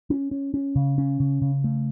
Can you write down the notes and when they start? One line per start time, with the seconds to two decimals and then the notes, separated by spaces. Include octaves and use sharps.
0.10 C#4
0.31 C#4
0.54 C#4
0.76 C#3
0.98 C#4
1.20 C#3
1.42 C#3
1.64 A3